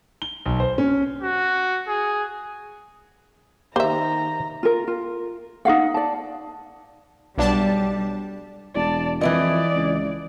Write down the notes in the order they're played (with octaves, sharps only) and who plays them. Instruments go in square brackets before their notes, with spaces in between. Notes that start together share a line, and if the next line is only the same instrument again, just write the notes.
[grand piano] G7
B1
C5
C#4
[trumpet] F#4
G#4
[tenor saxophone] D#3 [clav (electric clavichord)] A#3 G4 [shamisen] C5 E5 [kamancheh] A#5
[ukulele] F4 A#4
F4
D#4 F#4 F5 F#5
D5 A5
[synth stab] B1 D4 A5 [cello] G3
[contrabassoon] E1 [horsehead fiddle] D5 A5
[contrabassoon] F2 [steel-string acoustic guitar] E3 E4 D#5 [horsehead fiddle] D5
[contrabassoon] C#2